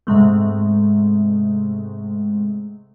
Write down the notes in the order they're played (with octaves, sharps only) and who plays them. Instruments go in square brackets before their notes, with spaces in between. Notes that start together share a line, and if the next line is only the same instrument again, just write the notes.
[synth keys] G#2 C3 G#3 A3